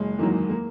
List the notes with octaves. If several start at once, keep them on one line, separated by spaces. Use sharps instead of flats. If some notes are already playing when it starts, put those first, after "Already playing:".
Already playing: F#1 G#3
E2 D#3 F#3 A#3
A#3